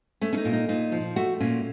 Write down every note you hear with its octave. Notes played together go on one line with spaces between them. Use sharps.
A3 C#4
C#4
D#4
A#2
D#4
A#2 D#4
F3
A3 F#4
A#2 C#4